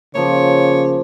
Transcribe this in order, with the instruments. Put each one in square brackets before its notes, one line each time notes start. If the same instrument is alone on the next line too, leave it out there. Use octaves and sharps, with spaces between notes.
[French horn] C#3 [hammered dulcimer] F3 A#3 [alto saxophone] C#5